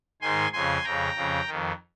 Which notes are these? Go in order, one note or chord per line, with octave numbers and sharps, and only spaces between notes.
G#2 D#3 G#5 C6
F2 C#3 G#5 C6
F2 C#3 G5 A#5
F2 C#3
F2 D#3